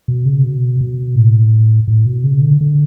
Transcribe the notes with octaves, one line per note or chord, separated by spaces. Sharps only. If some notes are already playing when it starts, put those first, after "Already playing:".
B2
C#3
B2
B2
A2
A2
B2
C#3
D3
D3